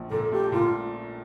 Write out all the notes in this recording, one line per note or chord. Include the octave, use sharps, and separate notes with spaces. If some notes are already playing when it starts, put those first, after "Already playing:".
Already playing: A#1
A#2 A4
A3 G4
A#2 F4